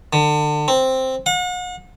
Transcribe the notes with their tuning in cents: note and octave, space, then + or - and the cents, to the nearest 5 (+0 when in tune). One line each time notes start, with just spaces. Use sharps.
D3 +30
C4 +0
F#5 -40